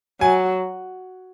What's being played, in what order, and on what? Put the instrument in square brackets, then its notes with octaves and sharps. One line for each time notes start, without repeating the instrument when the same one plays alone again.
[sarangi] F#3 [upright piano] G#5